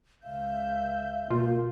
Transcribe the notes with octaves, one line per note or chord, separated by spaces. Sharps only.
C#2 E5 F5 G6
B2 A#3 F4